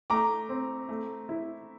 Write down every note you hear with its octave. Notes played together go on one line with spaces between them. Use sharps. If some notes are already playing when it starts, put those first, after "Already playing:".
A3 A#5 D6
C4
A3
E4